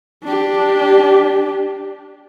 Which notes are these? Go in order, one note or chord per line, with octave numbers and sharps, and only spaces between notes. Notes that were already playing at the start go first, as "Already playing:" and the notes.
D4 G4